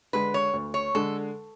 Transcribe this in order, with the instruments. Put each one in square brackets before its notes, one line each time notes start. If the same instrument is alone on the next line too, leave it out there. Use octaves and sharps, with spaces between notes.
[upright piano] D3 G#3 [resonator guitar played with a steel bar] B4
[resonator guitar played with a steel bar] C#5
[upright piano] D2
[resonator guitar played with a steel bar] C#5
[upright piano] D3 G#3 [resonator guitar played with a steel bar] A4